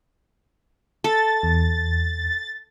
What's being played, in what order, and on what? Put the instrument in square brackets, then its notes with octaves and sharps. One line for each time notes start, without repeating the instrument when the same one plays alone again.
[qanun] A4 [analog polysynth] A6
[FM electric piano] E2